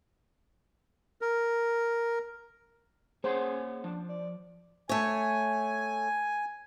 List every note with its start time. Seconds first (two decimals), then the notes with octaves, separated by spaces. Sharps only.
1.22 A#4
3.24 A#3 G#4 C5 C#5 F#5
3.84 F3 D4
4.09 D5
4.89 A3 C#5 G#5